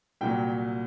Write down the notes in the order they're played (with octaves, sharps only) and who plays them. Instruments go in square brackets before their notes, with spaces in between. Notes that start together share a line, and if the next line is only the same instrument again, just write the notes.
[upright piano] C2 A#2 F#3 G5